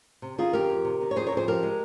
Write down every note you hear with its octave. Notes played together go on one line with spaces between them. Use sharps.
C3
D#3 F4 G#4
F2 G4 A#4
F2
C3
D#3
C#5
F2 G#4 C5
A#4 C#5
F2 G#4 C5
F3 G4 A#4
G#3